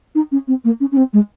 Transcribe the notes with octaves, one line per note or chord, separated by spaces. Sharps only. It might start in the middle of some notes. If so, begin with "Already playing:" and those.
D#4
C#4
C4
A#3
C#4
C#4
C4
G#3